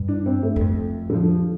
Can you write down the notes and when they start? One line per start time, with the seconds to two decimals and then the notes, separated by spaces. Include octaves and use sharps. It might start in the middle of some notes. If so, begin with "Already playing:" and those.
Already playing: G2
0.08 D4
0.26 C4
0.43 A3
0.56 G2
0.61 F2
1.10 D3
1.14 F3